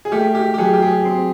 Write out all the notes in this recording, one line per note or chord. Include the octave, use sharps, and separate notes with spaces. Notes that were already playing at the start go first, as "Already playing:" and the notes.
G#4
A3 G4
G4
G4
F#3 G#4
G4
G#4
C4